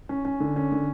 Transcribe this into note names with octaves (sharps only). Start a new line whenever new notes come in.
C#4
C#4
D3
C#4
D3